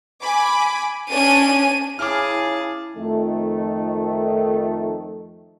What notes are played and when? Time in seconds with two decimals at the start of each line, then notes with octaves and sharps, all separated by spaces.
0.21 G#5 B5 D6
1.10 C#4 D4 D#7
1.99 C#3 E4 G#4 A5 D6 F6
2.96 F2 D#3 A3